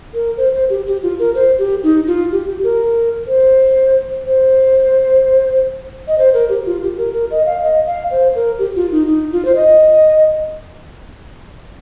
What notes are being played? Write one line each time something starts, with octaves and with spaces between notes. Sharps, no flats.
A#4
C5
C5
G4
G4
F4
A#4
C5
G4
D#4
F4
G4
G4
A#4
C5
C5
D#5
C5
A#4
G4
F4
G4
A#4
A#4
D#5
F5
D#5
F5
C5
A#4
G4
F4
D#4
D#4
F4
C5
D#5